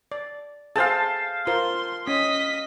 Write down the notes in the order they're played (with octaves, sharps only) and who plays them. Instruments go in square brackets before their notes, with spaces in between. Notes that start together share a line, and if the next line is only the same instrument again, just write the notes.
[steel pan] D5
[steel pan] G#4 A4 C5 [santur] F5 G5 A5
[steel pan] F4 A#4 C5 [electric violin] C6
[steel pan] C#4 [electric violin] D#5 B6